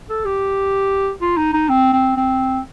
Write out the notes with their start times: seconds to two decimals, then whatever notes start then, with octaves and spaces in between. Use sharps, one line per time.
0.09 A4
0.25 G4
1.21 F4
1.37 D#4
1.53 D#4
1.69 C4
1.93 C4
2.17 C4